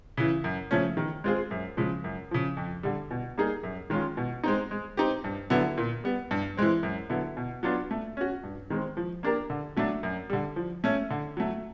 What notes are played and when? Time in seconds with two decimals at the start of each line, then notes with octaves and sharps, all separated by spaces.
0.17 C#3 E3
0.44 F#2
0.71 C#3 F3 A3 C#4
0.97 D#3
1.24 G#3 C4 F4 G#4
1.51 F#2
1.77 C#3 F3 G#3
2.04 F#2
2.31 C#3 F3
2.57 F2
2.83 D3 G3
3.11 B2
3.38 G3 A#3 D#4 G#4
3.63 F#2
3.90 D#3 G#3 C#4 F4
4.17 B2
4.43 G#3 C4 D#4
4.71 G#3
4.97 C4 D#4 G4
5.24 G2
5.50 D3 F#3 B3 E4
5.78 A#2
6.04 G3 B3
6.31 G2
6.57 E3 G#3 C4
6.83 F#2
7.10 D3 F#3 B3 E4
7.37 B2
7.63 F#3 B3 D4 F4
7.91 A3
8.17 C#4 F#4
8.43 G2
8.70 D#3 G#3 C4
8.97 F3
9.23 A#3 D4 G4 A#4
9.50 D3
9.77 F#3 A3 D4
10.03 F#2
10.30 D3 G3
10.56 F3
10.84 A3 C#4
11.10 D3
11.37 F#3 A3